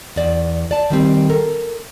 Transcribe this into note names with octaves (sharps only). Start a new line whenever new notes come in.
E2 D5
D5 A5
D#3 G3 C4 G4
A4 A#4